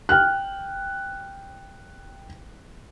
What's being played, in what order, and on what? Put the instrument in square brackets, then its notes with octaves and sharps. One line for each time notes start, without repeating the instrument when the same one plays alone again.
[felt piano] G5 F6 F#6